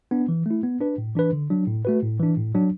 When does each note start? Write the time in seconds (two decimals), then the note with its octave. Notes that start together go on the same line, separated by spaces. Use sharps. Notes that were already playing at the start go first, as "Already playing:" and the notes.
0.11 B3 D4
0.28 E3
0.46 A3 E4
0.63 B3
0.80 D4 B4
0.98 A2
1.15 E3 D4 B4
1.33 D3
1.50 F#3 D4
1.67 A2
1.85 A3 F#4 B4
2.03 A2
2.20 E3 D4
2.37 A2
2.55 F#3 D4